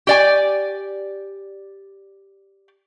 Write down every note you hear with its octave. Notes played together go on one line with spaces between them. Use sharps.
G4 D5 G#5